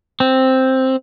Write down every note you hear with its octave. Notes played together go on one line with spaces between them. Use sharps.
C4